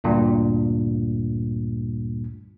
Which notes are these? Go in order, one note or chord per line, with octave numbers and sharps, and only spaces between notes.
D2 G2 A#2